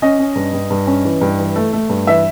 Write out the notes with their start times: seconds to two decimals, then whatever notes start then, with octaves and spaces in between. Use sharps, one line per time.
0.02 C#4 D#5
0.19 C#4
0.36 G2
0.53 G2
0.70 G2
0.87 C#4
1.05 E3
1.21 G2
1.39 E3
1.56 A3
1.73 A3
1.89 G2
2.07 E3 E5